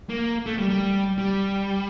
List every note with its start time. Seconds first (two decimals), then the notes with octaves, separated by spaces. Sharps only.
0.09 A#3
0.46 A3
0.58 G3
0.69 G3
1.18 G3